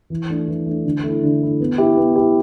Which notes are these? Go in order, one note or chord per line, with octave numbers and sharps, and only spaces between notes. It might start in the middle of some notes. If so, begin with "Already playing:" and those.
E3
A3 D4
E3
A3 D4
D3
A3 E4
D3
A3 E4
B3
E4 G4
B3
E4 G4